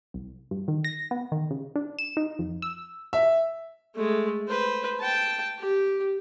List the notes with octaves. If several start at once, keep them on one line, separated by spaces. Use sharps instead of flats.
C2
G2
D#3
A#6
B3
D#3
C#3
D4
E7
D#4
F2
E6
E5
G#3 A3
B4 C5
G5 A5
G4